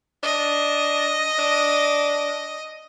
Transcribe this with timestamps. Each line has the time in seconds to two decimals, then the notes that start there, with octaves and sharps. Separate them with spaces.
0.23 D4 D#5
1.39 D4